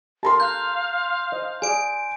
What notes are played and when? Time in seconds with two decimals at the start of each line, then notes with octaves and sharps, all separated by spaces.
0.23 G4 A4 A#4 A5 A#5 C6
0.40 F5 F#6 G6
1.32 C5 D#5
1.62 G#4 D5 F5 G#5 D7